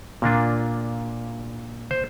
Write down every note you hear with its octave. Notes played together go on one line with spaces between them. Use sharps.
A#2 A#3 D4 F4
C5